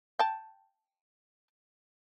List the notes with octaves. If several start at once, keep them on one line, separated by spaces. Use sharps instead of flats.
G5 A5